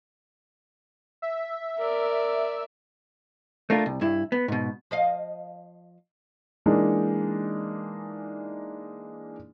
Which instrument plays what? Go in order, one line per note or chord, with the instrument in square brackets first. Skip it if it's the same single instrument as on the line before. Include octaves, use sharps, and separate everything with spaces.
[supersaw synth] E5
[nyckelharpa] A#4 D5
[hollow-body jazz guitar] A3 A#3 D4 F4
C2
G2 E4
B3
G#2 B2
[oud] F3 D#5 F5
[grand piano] E3 G#3 A#3 D4 D#4